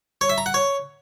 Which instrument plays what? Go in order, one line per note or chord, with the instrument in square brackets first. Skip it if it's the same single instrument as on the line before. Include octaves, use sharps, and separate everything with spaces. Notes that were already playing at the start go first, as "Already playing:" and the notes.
[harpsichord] C#5
E5
A#5
F#5
C#5